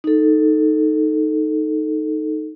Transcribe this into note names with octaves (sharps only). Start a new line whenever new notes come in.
D#4 A4